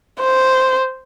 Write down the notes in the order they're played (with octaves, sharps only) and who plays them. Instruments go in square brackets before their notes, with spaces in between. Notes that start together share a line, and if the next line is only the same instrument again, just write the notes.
[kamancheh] C5